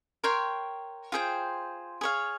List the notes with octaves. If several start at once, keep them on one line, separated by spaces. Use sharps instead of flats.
A#4 C#5 G5 C6
F4 G#4 C5 G5
G#4 C#5 F5